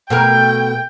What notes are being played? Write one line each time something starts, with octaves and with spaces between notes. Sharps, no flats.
B2 A3 A#4 G5